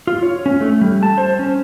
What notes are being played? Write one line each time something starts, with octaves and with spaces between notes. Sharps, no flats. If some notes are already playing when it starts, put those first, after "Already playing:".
F4
C#5
C#4
A3
G3
A5
C5
C#4